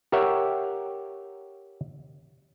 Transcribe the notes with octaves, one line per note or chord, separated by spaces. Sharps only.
G4 A#4 C#5 E5 F#5 G5